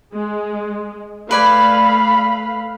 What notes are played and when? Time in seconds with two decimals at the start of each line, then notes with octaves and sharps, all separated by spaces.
0.13 G#3
1.31 A3 B4 D5 F5 G#5 B5